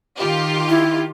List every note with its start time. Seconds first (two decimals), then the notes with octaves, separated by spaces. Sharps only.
0.17 D#3 F4 G4
0.69 E4